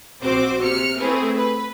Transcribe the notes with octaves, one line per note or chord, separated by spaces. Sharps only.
A#1 C4 F#4 C5 D6
C3 F6 C#7
A3 C4 E4 G#4 B4
B4